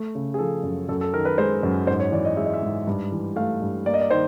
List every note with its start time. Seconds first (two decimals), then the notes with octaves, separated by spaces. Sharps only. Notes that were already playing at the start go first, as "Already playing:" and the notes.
Already playing: A3
0.15 C#3
0.34 G#4
0.39 F3 A4
0.63 F#2
0.89 F#2 A4
1.01 A4
1.14 D#3 A#4
1.25 B4
1.38 G#3 C5
1.63 F#2
1.87 G#2 C5
2.00 C#5
2.12 E3 D5
2.25 D#5
2.37 G#3 E5
2.45 D#5
2.54 E5
2.63 G#2
2.87 G2
3.12 E3
3.36 A3 F5
3.62 G2
3.86 A#3 D5
3.94 D#5
4.01 D5
4.10 D#3 C5